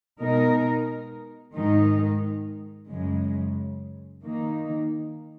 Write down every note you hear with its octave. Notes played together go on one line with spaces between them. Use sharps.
B2 G#3 D#4 A#4
G#2 D#3 G#3 D#4
F#2 C#3 G#3
D#3 A#3 D#4